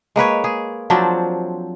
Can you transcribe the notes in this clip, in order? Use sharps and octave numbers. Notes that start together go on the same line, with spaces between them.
G#3 A#3 B4 C#5
G#4
F3 F#3 C4 D4